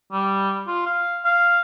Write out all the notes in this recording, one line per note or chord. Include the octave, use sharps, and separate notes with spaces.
G3
F4
F5
F5